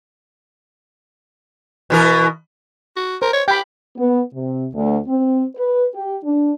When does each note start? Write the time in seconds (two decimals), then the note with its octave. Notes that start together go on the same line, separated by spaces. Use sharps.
1.90 B2 E3 A#4
2.96 F#4
3.22 A#4 C5
3.34 C#5
3.48 G4 G5 B5
3.97 B3
4.34 C3
4.74 D2
5.07 C4
5.56 B4
5.94 G4
6.23 D4